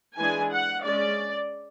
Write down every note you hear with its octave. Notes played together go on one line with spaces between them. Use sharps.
E3 G#3 D4 G#5
F#5
G#3 C#4 D5